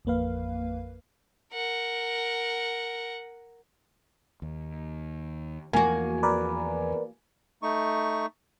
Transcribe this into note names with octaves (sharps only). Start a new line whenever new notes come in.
A1 F2 A#3 B4 F5
A#4 F#5
D#2
E2 E3 F3 A#3 F#4 G#5
A#4 B4 D5
A3 D#4 C#6